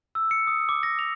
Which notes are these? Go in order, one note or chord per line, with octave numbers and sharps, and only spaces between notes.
E6
C#7
D#6
D6
A#6
F7